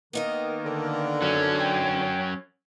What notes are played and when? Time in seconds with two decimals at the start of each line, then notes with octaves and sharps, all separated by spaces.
0.13 D#3 A#3 B3 D#4 A#4 D#5
0.65 D3
1.22 F#3 C#4
1.59 G5